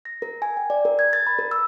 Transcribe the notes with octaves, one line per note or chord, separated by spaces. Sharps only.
A#6
A#4
G#5
G5
D5
A#4
G#6
A6
B5
A#4
E6